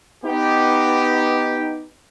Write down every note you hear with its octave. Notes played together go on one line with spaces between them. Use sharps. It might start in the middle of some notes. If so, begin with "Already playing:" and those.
B3 D#4 G4